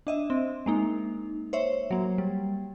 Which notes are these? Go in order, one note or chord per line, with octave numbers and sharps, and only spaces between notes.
D4 D#5 E5
C4
G#3 A#3 D#4
C5 C#5 E5
F#3 A#3
G3